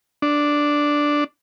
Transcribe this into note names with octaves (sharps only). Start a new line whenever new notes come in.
D4